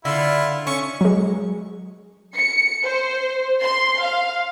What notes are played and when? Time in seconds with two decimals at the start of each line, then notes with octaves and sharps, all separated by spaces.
0.05 D3 E4 F4
0.67 C#4 C#6
1.01 F#3 G#3
2.36 C#7
2.84 C5
3.61 C6
4.01 F5